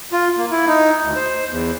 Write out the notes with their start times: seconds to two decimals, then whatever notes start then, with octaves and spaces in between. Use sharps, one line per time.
0.12 F4
0.38 A#3
0.51 E4
0.67 D#4
1.03 D2
1.16 C5
1.48 E2